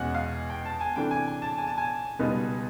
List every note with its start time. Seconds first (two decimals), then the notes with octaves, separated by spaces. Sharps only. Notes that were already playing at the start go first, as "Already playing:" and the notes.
Already playing: E2 B2 G#3 C#4 F#5 G#5
0.14 F5
0.50 G5
0.65 A5
0.81 G#5
0.96 C3 E3 A3 D4 G5
1.11 G#5
1.27 G#5
1.42 A5
1.58 G#5
1.67 A5
1.78 G#5
2.19 C#2 B2 G3 B3 D#4